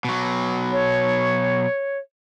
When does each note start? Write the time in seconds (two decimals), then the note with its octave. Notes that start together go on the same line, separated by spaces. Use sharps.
0.05 B2 F#3
0.72 C#5